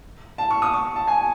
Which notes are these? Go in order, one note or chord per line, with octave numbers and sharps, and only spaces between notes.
A5
C#6
D#6
C#6
A5
G#5